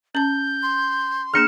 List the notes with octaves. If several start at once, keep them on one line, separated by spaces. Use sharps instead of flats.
C#4 A5 G6
C6
A#3 D4 G#4 F6 C#7 E7